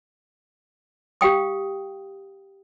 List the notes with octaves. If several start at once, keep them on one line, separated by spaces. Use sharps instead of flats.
G4 F5 G5 D#6